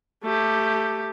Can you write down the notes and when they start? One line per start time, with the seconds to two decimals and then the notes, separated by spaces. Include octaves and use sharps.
0.24 A3 G4